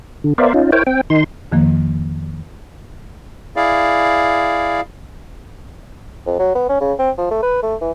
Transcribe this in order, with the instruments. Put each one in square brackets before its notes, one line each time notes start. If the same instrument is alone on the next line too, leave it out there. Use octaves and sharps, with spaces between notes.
[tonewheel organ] D3
B3 A#4 C5 D5 E5 F5
C#4 D#4 F4
E4 A#4 C5 C#5 G5
C4 G5
D#3 D#4 C6
[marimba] F2 D#3 F3 A#3
[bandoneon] E4 G#4 D5 F5
[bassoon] F2
F#3
B3
C#4
C#3
C4
F3
A3
B4
A3
E3